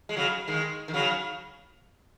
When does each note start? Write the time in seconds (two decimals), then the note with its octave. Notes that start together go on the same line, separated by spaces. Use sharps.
0.09 G#3
0.17 C#3 F#3
0.47 D#3 G#3
0.88 D#3
0.94 C#3 F#3